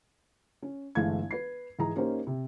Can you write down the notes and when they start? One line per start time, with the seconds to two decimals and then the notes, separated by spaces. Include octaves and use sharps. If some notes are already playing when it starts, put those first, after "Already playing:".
0.62 C#4
0.95 G1 E3 G#3 A3 F5 G#6
1.31 B4 C7
1.79 G#2 E3 G#4 A#5
1.96 A#3 C#4 D#4 G4 C5
2.27 C3